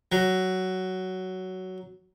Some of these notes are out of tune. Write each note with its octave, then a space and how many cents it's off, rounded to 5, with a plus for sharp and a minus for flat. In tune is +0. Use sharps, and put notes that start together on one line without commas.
F#3 +10